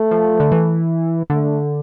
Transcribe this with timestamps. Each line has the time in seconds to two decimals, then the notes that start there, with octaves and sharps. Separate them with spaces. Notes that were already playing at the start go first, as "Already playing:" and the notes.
Already playing: A3
0.11 F3
0.40 D3
0.52 E3
1.30 D3 A3